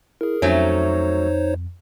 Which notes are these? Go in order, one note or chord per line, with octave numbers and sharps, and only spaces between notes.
E4 G#4 A#4
F2 F#3 A3 C#4 D#4 C5 C#5